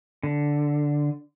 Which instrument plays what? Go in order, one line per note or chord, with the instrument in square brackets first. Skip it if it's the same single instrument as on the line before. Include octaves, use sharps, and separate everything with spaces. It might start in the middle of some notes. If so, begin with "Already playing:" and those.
[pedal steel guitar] D3